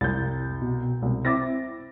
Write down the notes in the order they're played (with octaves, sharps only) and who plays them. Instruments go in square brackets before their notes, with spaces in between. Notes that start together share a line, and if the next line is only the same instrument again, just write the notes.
[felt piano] C2 G6 [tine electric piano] F2 E4 A6
[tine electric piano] B2
[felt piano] C2
[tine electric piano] C4 E4 E5 [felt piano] D6 A6 A#6